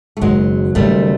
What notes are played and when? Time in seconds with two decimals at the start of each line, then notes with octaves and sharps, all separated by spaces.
0.17 A3
0.21 F#1 F#2 D#3 F#3 G#3
0.75 F#1 F#2 D#3 G3 A3